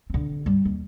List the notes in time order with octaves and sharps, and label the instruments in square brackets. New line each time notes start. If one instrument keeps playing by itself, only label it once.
[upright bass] D3 C4
G2 G3
D#2